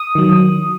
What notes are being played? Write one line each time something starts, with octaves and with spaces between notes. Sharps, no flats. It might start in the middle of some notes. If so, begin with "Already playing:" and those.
Already playing: D#6
D#3 F#3